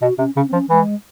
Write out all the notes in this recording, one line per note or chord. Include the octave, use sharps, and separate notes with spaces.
B2 F#4
C3 C#4
C#3 C#4
C4
F3 C#4
E3 G#3